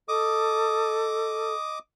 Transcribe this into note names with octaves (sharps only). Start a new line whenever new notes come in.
A4 D#5 D6 D#6